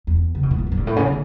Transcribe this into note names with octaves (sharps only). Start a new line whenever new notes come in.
E2
C#3
B2
A2
G2
F#2
A2
G2
A2
C#3
D3